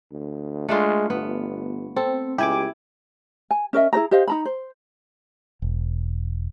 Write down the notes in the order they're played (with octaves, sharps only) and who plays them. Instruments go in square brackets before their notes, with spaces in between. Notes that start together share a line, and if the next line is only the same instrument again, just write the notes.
[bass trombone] D2
[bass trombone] G#3 [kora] A3 D4 F4
[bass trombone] G1 [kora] B3
[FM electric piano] C4 [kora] A4
[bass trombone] C#2 [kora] E4 [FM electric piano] G4 G#5 D6
[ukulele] G#5
C#4 A#4 D#5 E5
E4 G#4 C5 A#5
G4 C5 D#5 F5
D#4 A#5 B5
C5
[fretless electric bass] E1